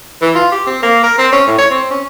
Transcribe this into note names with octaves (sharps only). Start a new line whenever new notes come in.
E3
F4
G4
C4
A#3
A#4
C4
C#4
A2
C#5
C4
C#4